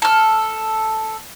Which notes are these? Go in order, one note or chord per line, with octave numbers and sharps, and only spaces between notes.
A4 F6